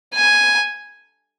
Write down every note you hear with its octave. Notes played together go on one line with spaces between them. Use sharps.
G#5